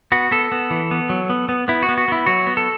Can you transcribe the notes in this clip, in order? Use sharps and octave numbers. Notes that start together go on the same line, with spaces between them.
B3 F#4
B3 A4
B3
E3
B3
F#3
B3
B3
B3 E4
F#4
B3
F#4
B3 E4
F#3 F#4
B3
A4